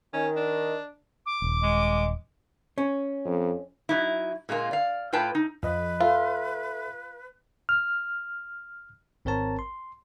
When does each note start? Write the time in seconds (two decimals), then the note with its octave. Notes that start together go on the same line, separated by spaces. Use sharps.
0.14 D#3 C#4
0.36 D4
1.26 D6
1.42 D#1
1.62 G#3
2.78 C#4
3.25 F2
3.89 F#3 D#4 E4
4.49 A#2 G#3 A#3 F4
4.71 D5 F5
5.13 A2 F4 B4 G5 A5
5.35 D#4
5.63 F2 F3 B4 D#5
6.01 F4 A4 E5
7.69 F6
9.25 G#1 C4 A#4 C#5 A5 A#5
9.59 C6